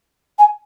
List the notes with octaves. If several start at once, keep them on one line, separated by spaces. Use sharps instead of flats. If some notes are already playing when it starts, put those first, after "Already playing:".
G#5